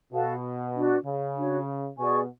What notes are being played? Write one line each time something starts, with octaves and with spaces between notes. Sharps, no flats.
B2 F#4 A4 F5 A5
D4 F#4 B4
C#3
D4 F#4 C#5
B2 G#4 D5 G#5 C#6